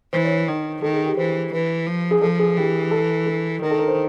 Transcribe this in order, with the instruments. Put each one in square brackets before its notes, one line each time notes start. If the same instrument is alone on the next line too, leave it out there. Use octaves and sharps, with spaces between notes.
[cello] E3 [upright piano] C5
[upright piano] C#5
[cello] D#3
[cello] D#3 [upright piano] A4
[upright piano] G#4
G4
[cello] E3 [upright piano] C5
[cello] E3 [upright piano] B4
[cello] F3
[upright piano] G#4
[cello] F3 [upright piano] A4
[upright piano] G#4
[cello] E3 [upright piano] G4
[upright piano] A4
A4
[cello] D#3 [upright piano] A#4
[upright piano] A4
A#4
C5